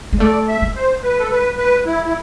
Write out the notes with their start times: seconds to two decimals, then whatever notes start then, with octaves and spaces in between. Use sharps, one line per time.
0.13 G#3
0.19 A3 D5
0.48 E5
0.62 G#3
0.76 C5
1.03 B4
1.19 A4
1.31 B4
1.58 B4
1.86 E4
2.06 E4